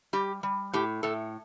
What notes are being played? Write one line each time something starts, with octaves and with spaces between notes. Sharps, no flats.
G3 G4
G3
A2 G4
A2 A4